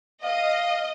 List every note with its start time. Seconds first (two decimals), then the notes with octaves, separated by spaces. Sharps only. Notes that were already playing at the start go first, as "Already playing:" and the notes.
0.24 D#5 F5